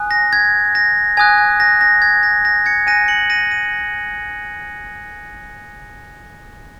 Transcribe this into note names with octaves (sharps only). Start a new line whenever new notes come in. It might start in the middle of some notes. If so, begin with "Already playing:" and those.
Already playing: G#5 D#6 F#6
A#6
G#6
A#6
G#5 D#6 F#6 G#6
G#6
A#6
A#6
G#6
A#6
A#6
G#6 C#7
G#5 F#6 A#6 D#7
C#7 F#7
A#6 D#7
A#6 D#7